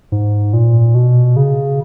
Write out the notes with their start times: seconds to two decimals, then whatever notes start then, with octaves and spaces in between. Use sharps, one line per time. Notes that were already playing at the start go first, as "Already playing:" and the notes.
0.12 G#2
0.53 A#2
0.95 B2
1.36 C#3